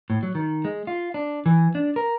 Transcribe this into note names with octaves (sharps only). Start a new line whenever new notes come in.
A2
F#3
D#3
G#3
F4
D4
E3
D4
A#4